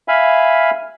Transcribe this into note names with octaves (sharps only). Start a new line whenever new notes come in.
E5 F5 G#5 B5